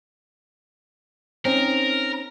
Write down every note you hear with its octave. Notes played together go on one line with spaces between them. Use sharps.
C4 C#4 D#4 A#4